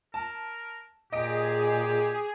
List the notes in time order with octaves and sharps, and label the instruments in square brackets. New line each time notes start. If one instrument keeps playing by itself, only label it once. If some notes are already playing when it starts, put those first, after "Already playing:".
[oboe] A#4 [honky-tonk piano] A5
[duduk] A#2 [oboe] G4 [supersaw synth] G#4 [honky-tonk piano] D#5 D7